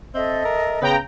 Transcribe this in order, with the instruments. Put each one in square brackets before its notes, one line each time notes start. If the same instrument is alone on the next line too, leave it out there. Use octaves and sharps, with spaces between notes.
[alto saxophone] C4 [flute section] A4 D#5 E5
[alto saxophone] A#4
[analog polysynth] C#3 G5 A#5 [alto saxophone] B3